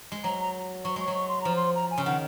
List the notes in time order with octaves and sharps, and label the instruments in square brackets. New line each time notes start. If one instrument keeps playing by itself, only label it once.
[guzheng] G#3
[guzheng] F#3 [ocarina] A#5
[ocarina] A#5
[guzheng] F#3 [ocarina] C#6
[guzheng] G#3 [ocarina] C#6
[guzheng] F#3
[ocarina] C#6
C6
[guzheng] F3 [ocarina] A#5
[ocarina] C6
A#5
G#5
[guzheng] C#3
[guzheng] D#3 [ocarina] F#5